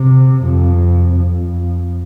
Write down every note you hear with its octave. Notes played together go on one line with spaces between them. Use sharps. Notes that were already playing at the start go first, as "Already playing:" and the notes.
Already playing: C3
F2
F2